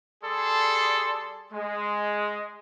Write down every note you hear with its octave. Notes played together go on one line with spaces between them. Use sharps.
G3 G#4 A4 D5 C6
G#3